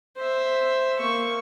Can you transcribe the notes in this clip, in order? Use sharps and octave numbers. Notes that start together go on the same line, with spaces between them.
C5 E5
A#3 C#6